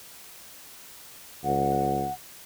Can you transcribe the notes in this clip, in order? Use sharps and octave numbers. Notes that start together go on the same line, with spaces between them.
C#2 F#5